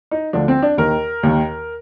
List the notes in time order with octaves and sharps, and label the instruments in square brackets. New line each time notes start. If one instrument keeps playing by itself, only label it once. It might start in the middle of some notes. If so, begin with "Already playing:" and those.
[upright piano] D#4
D2 D3 F3 D4
C4
D4
D#2 D#3 A#4
D#2 D#3